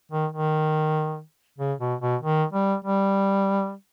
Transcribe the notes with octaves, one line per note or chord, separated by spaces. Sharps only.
D#3
D#3
C#3
B2
B2
D#3
G3
G3